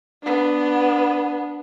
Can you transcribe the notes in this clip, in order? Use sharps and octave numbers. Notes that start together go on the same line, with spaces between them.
B3 D4